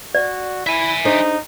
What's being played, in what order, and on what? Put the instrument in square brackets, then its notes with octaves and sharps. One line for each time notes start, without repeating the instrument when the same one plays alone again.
[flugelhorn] F#4 [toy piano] D5
[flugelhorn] E4 [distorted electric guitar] E5 G#5
[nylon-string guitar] D4 G#4 C5 [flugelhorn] D#4